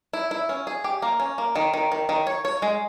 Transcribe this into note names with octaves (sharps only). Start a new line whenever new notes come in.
E4
E4
C#4
G#4
G4
A#3
C#4
A#3
D#3
D#3
D#3
D#3
C#5
C#5
G#3